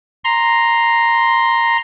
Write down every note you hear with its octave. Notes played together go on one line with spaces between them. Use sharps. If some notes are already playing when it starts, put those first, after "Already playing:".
A#5 C6